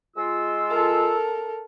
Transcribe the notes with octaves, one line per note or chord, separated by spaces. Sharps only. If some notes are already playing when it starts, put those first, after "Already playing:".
G#3 F4 E6
A4 A#4